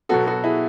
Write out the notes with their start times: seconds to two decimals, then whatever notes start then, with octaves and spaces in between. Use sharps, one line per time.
0.09 B2 F#3 B3 F#4 A4
0.26 F#4 A4
0.44 E4 G#4